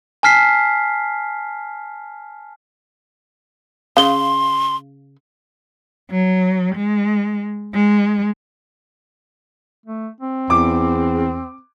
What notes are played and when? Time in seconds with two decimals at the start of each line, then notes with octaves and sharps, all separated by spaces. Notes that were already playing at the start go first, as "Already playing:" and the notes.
0.23 G#5 A5 F6 B6 C7
3.97 C#3 F5 C6 G7
6.11 F#3
6.76 G#3
7.74 G#3
9.86 A3
10.21 C4
10.50 E2 D6